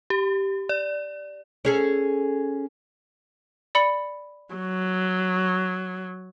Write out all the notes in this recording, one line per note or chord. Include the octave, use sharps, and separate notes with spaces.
G4
D5
C#4 G#4 A4
D5 B5 C#7
F#3